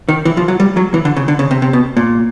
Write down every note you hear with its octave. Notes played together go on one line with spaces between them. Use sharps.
D#3
E3
F3
F#3
G3
F#3
E3
D3
C#3
D3
C#3
C3
C3
B2
A#2